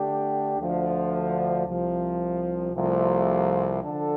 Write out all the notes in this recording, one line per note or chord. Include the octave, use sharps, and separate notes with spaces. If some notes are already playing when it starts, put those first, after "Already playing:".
Already playing: D3 A3 D4 G4
D2 D3 F3
C2 C3 F3
C2 C3 F3 A3 F4
D3 F3 D4 A4